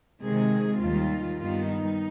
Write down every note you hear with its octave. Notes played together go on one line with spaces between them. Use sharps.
C3 D#3 G#3 G#4
D#2 D#3 G3 F4
G2 D#3 G3 B3 F4
D#4